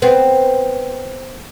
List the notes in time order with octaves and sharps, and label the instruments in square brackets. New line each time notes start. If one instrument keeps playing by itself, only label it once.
[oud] B3 C4